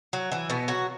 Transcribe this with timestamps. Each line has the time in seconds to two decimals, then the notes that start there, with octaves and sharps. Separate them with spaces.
0.13 F#3 F#4
0.32 E3 E4
0.50 B2 B3
0.68 F#3 F#4